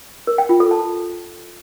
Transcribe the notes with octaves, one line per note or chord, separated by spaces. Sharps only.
A#4
G5
F4
A4
A5